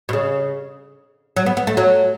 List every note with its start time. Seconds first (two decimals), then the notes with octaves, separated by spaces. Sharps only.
0.09 B2
0.13 C#3
1.36 F#3
1.46 B3
1.57 B3
1.67 A3
1.77 F#3